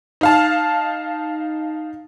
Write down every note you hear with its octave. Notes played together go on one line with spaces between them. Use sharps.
D#4 F5 A5